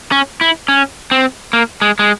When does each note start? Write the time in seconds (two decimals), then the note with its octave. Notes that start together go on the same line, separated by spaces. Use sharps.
0.12 C#4
0.41 E4
0.68 C#4
1.11 C4
1.53 A#3
1.82 G#3
1.99 G#3